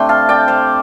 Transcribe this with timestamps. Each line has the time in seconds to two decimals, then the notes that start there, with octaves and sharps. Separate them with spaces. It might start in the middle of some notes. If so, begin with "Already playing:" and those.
Already playing: C3 A3 D4 G5 C6
0.09 F5 A5
0.29 D5 G5
0.48 C5 F5